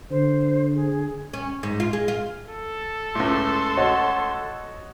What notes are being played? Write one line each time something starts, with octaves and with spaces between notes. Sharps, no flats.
D3 C5
G#4
C#4
G#2
F4
G#3
F4
A4
C#2 A2 C6
F#4 C#5 D#5